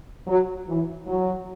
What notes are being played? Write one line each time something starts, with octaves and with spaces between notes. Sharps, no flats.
F#3
E3
F#3